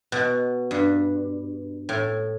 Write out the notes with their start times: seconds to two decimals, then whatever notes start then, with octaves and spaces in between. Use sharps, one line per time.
0.12 B2
0.71 G2
1.89 A2